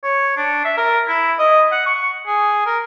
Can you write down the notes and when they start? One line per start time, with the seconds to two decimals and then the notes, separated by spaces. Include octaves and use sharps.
0.03 C#5
0.37 D4
0.65 E5
0.78 A#4
1.08 E4
1.39 D#5
1.72 F#5
1.86 C#6
2.27 G#4
2.66 A#4